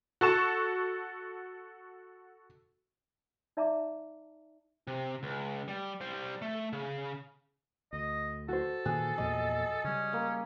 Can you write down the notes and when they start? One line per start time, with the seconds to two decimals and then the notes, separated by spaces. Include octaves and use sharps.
0.21 F#4 A4 C#6 E7
3.57 D#4 D5 E5 A5 A#5 D6
4.87 C3
5.23 C#2
5.68 G3
6.01 G3 C5
6.42 A3
6.73 C#3
7.93 D2 D#5
8.48 F#4 A4 C5
8.85 A#2 D#3 E3 G#4 F#6
9.18 E2 A#2 F3 D#5
9.84 C#3 G3 C#4
10.13 A#3